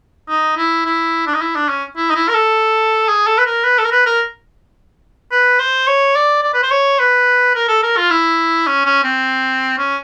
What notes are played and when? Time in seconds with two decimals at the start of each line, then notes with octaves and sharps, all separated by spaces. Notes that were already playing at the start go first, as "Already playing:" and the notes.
0.29 D#4
0.57 E4
0.85 E4
1.26 D4
1.34 D#4
1.41 E4
1.55 D4
1.69 C#4
1.97 E4
2.10 D#4
2.15 E4
2.28 A#4
2.34 A4
3.08 G#4
3.27 A4
3.38 B4
3.46 A#4
3.64 B4
3.78 A4
3.84 A#4
3.92 B4
4.06 A#4
5.31 B4
5.59 C5
5.87 C#5
6.15 D5
6.43 D5
6.53 B4
6.62 C5
6.71 C#5
6.99 B4
7.55 A#4
7.68 A4
7.83 A#4
7.97 F4
8.10 E4
8.67 C#4
8.85 C#4
9.04 C4
9.78 C#4